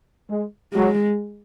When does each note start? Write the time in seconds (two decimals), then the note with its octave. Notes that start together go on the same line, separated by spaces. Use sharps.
0.30 G#3
0.73 F#3 G#3